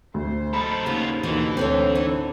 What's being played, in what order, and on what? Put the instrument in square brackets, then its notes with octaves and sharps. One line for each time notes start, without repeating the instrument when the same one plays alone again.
[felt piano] D2 [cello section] C5
[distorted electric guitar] D#4 A4 [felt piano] B5
[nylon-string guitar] D#2 C#3 [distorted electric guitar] B3 F4
[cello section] D#2 D3 [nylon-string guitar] B2 [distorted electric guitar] E3
[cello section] D2 D3 [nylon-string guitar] C4 A4 C#5
[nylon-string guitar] D4 D#4 [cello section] A4